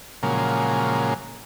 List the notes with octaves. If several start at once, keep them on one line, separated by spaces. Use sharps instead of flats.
A#2 C#3 F3 F#3 G#3 A#3